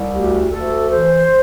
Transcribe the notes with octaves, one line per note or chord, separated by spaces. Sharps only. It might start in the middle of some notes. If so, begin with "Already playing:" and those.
Already playing: C2
D2 G4
D2 A4
E3 C5